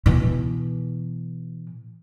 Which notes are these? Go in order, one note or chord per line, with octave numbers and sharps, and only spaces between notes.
B2 E3